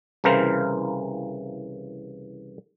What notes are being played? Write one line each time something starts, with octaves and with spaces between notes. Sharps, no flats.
C2 C#3 E3 A#4 C5 F5